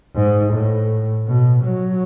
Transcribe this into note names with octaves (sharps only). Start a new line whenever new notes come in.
G#2
A2
B2
F#3